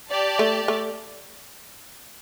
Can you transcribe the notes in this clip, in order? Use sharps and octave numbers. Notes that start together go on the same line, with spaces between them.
G4 D5 A5
A3
A3